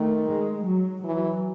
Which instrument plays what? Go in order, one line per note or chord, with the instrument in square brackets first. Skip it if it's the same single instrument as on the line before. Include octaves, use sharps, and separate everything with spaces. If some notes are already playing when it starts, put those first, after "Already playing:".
Already playing: [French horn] D#3 [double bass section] A3
[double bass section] G#3
F#3
[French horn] E3 [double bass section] F#3